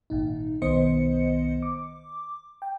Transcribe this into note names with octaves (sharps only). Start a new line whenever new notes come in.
G#1 A#2 D#4
B1 D#3 B3 C5 D#5 C#7
D6
G5